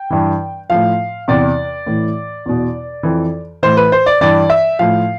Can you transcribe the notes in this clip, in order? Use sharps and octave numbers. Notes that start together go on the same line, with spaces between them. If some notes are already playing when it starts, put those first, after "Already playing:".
Already playing: G5
G2 E3
A2 F3 F5
E2 C3 E3 D5
A2 E3
E2 B2
F2 E3
A2 E3 C5
B4
C5
D5
G2 E3 D5
E5
A2 F3 F5